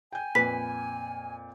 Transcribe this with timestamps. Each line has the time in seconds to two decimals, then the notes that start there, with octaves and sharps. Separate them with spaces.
0.12 G5 G#5 G6
0.35 F2 A#2 B4 B6